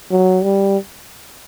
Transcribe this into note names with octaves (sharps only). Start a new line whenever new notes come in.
F#3
G3